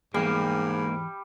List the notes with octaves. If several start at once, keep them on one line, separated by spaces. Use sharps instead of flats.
E2 G#2 G3 G#3 A#3 G#4